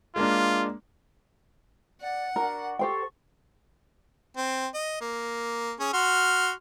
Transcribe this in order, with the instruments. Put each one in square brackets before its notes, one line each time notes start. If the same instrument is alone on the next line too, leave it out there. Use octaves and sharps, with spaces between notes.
[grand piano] G#3 A#3 D4 [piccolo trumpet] F4
[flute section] D5 [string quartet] F#5
[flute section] D4 F#4 [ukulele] A#4
[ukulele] G4 C5 G5 [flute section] A4 C#6
[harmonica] C4
D#5
A#3
C#4 G#4
F#4 C6 F6